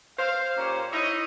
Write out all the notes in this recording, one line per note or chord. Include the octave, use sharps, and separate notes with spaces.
C5 F5
A#2 A#3 C#4 G4 C5 C#5
D#4 E4 C#5 D#5